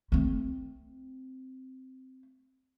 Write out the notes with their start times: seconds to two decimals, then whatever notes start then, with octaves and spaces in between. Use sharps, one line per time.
0.12 A3 C4